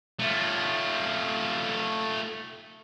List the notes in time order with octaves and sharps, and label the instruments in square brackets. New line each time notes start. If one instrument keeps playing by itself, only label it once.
[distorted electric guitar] A3 F4